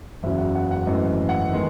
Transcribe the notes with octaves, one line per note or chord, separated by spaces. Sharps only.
F#1 E2 C#3 F#3 E5
F#5
F#5
F#5
G#1 F#2 E3 A3 D#5
F#5
D#3 G#3 B3